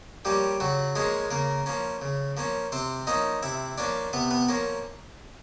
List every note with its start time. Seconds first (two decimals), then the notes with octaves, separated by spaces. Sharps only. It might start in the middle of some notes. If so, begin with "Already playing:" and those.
0.25 F3 G3 A#3 C#4 G4
0.60 C#3 F#3 F#4
0.95 F3 G#3 A#3 C#4 G#4
1.31 C#3 A#3 A#4
1.66 F3 A#3 C#4
2.02 C#3
2.37 F3 A#3 C#4
2.72 C3 C4 C5
3.07 F3 A#3 C#4 D#4 D#5
3.43 C3 E4 E5
3.78 F3 A#3 C#4 D4 D5
4.13 C3 B3 B4
4.31 B3 B4
4.48 F3 A#3 C#4 A#4